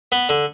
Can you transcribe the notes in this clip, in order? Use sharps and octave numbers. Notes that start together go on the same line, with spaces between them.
B3
D3